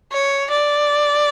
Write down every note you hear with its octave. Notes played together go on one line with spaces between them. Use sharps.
C#5
D5